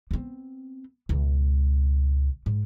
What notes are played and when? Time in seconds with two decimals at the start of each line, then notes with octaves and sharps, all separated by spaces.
0.11 B3 C4
1.09 C#2 B2
2.46 G#2